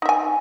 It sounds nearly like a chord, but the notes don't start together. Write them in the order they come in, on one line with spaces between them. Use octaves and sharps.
D#4 E5 G#5